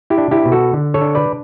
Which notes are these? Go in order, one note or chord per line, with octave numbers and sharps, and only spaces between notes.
E4 G4
D4
E4 G4
B2
F#4 A4
D3
A4 C#5
D4
B4 D5